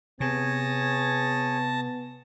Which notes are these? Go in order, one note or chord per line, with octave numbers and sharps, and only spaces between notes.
C3 B3 G#4 C#5 A5 A#6